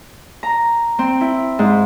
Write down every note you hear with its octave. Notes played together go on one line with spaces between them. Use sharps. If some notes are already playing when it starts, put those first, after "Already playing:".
A#5
C4
E4
G#2